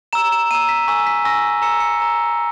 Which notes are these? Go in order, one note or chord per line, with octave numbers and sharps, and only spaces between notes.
A#5 E6 E7
E7
A#5 E6 D#7
B6
G#5 C#6 E6 B6
B6
G#5 C#6 E6 A#6
A#5 E6 C#7
C#7
A#5 E6